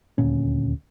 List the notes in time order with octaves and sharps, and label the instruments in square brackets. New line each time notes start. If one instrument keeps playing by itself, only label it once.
[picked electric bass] D#1 D2 A#2 C#4